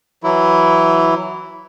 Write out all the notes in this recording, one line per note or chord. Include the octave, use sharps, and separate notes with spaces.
E3 F#3 E4